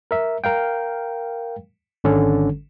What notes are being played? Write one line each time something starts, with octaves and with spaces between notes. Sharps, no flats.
A#4 E5
A#4 F5 G5
G#1 D3 C#4 A4